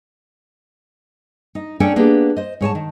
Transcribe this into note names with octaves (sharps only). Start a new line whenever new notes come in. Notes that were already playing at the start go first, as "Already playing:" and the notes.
D#4
C#4 D4 A4 C#5 G5
A#3 B3 D4 G4 G#4
C5 D#5
G#2 C#5 G#5 A5
D#3